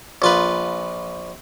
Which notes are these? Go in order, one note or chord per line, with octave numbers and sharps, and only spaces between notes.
A#1 F4 B4